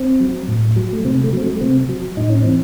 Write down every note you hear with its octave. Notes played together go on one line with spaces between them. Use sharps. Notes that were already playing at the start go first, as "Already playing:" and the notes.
Already playing: C4
F#3
A2
F#3
A3
C3 C4
A3
F#3 C4
A3
A3
C3 C4
F#3
A2 D#4
C#4
E3 C4